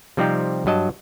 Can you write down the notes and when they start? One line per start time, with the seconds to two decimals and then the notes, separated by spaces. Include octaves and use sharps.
0.17 C3 F3 G3 C4 D#4 G4
0.66 G2 F#3 D#5 A5